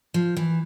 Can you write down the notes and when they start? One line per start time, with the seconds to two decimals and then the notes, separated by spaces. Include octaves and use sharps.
0.14 F3
0.37 E3